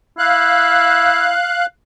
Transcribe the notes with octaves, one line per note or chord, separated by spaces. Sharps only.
E4 F5 F#6